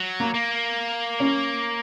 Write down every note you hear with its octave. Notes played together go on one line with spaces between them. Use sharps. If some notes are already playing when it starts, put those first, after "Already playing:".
Already playing: F#3
A#3
A#3
C#4